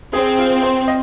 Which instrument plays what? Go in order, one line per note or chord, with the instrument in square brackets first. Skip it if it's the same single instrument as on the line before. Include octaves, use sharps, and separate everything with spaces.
[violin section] C4 [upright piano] G#4
[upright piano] F4
C5
D#5